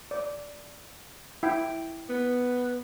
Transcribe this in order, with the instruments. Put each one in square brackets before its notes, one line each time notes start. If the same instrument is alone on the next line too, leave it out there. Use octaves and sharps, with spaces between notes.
[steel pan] D5
E4 G5
[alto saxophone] B3